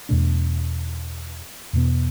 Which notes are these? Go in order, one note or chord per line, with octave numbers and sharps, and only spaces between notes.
E2 B2 A3 D4
E2 B2 B3